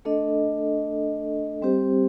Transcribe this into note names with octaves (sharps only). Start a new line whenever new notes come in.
A3 D4 A4 D#5
G3 C4 G4 C5